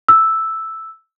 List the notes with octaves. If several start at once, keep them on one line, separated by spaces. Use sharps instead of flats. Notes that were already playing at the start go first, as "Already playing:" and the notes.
E6